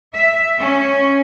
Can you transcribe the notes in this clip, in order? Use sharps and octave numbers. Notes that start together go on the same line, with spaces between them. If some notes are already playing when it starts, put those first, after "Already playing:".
E5
C#4